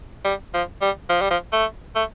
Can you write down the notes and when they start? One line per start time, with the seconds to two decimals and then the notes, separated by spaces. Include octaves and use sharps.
0.25 G3
0.54 F3
0.81 G3
1.09 F3
1.21 G3
1.31 F3
1.52 A3
1.95 A3